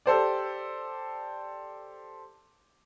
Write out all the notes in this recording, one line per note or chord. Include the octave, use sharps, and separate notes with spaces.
G4 A4 C5 D5